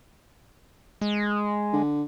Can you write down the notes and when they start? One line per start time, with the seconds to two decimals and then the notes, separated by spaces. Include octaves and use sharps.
1.01 G#3
1.73 D3